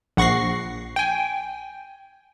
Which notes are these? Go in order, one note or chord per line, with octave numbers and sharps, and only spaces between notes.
A#1 F#5 C#6 A#6 C7
G5 G#5